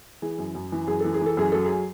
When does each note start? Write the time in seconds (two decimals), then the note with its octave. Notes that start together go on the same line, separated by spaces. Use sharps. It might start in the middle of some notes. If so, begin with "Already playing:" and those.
0.22 E3 G#4
0.38 F#2
0.55 F#2
0.72 E3
0.87 F#2 G#4
1.00 E3 A4
1.14 G#4
1.21 E3 A4
1.37 F#2 G#4
1.52 F#3 A4
1.66 G#4